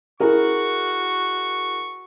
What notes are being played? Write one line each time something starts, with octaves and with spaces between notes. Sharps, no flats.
E4 F#4 G#4 A#4 C#6